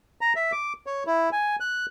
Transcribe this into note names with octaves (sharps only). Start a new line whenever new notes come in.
A#5
E5
D6
C#5
E4
G#5
F#6